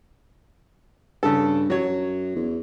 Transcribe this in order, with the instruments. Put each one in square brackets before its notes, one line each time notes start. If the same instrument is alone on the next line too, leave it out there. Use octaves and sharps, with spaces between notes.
[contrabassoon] G2 [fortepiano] C#3 A4
[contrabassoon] F#2 [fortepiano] F#3 C#5
[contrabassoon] E2